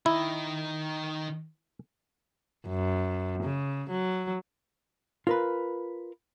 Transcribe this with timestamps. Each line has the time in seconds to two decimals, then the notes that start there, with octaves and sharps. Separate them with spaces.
0.06 D#3 E4 D#5
2.68 F#2
3.44 C#3
3.90 F#3
5.27 F4 A#4 B4